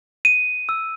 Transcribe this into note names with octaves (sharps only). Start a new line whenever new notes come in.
D#7
E6